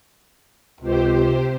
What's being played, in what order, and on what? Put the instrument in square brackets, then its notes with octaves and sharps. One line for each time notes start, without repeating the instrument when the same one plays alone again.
[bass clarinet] C#2 [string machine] C3 G4 C5